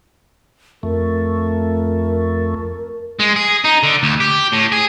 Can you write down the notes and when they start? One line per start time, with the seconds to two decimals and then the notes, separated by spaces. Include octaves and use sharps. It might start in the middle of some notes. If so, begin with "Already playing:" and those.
0.83 F2 A3 A#4
3.19 G#3
3.36 G#4
3.65 D#4
3.83 D3
4.03 D2
4.20 G4
4.52 A2
4.72 G#4